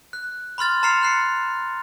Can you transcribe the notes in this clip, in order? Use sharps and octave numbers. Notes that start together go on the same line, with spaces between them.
F#6
B5 C6 F6 A6
A#5 C6 F6 C7 C#7 F7
F#6 C7 C#7